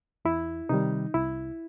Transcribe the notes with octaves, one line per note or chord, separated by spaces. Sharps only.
E2 E4
C3 D#3 G3 D#4
C2 E4